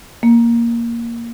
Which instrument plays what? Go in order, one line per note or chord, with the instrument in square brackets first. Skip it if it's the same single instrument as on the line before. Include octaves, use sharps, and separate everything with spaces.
[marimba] A#3